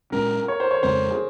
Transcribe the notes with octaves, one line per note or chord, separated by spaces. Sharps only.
A#2 G#3 C#4 A#4
C#5
C5
C#5
F2 C#3 G#3 C4 C5
G#4